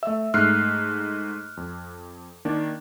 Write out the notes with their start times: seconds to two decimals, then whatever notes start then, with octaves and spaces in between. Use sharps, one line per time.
0.03 A3 E5 E6
0.34 G#2 A3 F6 F#6 C7
1.57 F2
2.45 D#3 A#3 D4